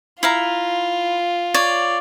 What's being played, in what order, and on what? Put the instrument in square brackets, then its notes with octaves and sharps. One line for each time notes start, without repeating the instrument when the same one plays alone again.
[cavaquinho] E4 F5 A#5 [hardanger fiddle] F4
[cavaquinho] C#5 D5